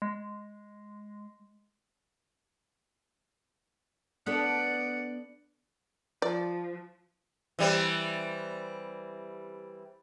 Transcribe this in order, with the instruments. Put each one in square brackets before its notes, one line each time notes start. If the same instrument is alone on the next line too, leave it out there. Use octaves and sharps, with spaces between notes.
[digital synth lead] G#3
[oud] B3 D4 A4 [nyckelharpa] D5 F#5
[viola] F3 [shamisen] D5
[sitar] E3 G3 C4